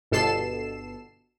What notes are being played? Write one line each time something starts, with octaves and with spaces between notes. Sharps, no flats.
G1 B2 A4 C7 E7